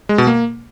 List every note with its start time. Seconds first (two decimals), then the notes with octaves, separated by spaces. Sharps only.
0.09 G#3
0.18 B2
0.27 A#3